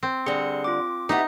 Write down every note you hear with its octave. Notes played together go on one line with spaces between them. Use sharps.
C4
D3 G3 G#4 C6 C#7
F4 D6
B3 D#4 E4 G4